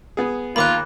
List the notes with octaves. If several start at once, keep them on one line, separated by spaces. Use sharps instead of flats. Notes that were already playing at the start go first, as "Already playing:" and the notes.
B3 G#4
D#2 A#3 F4 B5 D6 F#6